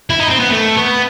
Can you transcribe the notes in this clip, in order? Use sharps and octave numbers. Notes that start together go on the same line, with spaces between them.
E4
D#4
C4
B3
A3
B3